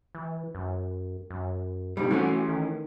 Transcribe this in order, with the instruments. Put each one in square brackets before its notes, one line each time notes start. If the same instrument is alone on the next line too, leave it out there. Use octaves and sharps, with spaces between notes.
[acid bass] E3
F#2
F#2
[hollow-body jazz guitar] C2 G#2 G3 [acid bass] B2
[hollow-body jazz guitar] E3 A3 C#4 [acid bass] F#4
[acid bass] D#3